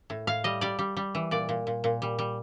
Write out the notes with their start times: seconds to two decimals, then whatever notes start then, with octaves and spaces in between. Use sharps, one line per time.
0.10 A2
0.27 A2 F5
0.44 G3 D#5
0.61 G3 D5
0.79 G3
0.97 G3
1.15 E3
1.31 A#2 D5
1.49 A#2
1.67 A#2
1.84 A#2
2.02 G3
2.19 G3